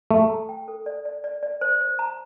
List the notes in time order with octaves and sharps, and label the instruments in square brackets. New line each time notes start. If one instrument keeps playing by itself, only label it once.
[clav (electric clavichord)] A3 [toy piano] A4
[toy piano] A#5
G5
A4
D5
D5
D5
D5
C5
C5
A#5